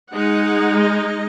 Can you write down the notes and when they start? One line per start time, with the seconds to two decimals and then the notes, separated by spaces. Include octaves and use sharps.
0.12 G#3 D#4 F#5
0.79 D#5